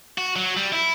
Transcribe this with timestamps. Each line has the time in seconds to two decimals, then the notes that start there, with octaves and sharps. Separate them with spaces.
0.18 F#4
0.36 F#3
0.57 G3
0.72 E4